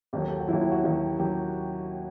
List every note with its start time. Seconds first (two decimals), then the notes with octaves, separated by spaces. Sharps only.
0.13 D#2 D#3 F#3 G4
0.22 A4
0.31 G4
0.40 F#4
0.48 D#2 D#3 F#3 E4
0.61 E4
0.72 F#4
0.83 D#2 D#3 F#3
1.19 D#3 F#3 G4